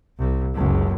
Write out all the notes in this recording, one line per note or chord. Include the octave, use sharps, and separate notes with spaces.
C2
F#1 C#2